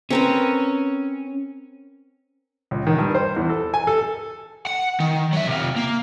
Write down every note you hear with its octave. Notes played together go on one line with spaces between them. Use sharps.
C4 C#4 A#4 B4
C#2
D#3
G2
C5
E2
A4
G#5
A4
F#5
D#3
F#3 E5
C3 F4
A#3